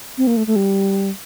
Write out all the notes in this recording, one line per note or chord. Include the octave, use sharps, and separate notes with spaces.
C4
A#3
A3
A3
G3